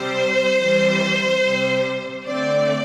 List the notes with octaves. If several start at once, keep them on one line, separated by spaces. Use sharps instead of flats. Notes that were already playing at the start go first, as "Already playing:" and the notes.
Already playing: C3 G3 C4 C5
E3 G3 C4
C3 G3 C4
D3 A3 C4 D5